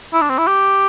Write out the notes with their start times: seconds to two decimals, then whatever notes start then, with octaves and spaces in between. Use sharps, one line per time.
0.14 E4
0.22 D4
0.30 C4
0.38 E4
0.47 G4